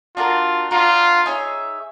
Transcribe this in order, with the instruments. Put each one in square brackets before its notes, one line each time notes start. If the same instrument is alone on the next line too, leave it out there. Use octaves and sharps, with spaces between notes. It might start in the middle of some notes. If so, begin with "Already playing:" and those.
[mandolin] D4 F#4 A#4 [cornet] F4
[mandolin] D4 F#4 A#4 [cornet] F4
[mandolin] D#4 G#4 C#5 E5